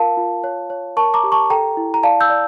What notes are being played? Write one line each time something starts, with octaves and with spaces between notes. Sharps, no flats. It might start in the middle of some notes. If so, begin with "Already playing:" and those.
Already playing: F4 A#4 F5 A5
F4
C#5
C#5
A#4 A5 C#6
A#5 D6
G4
A5 C#6
A4 G5 A#5
E4
A#5
D5 F5 A5
E6 G6
D5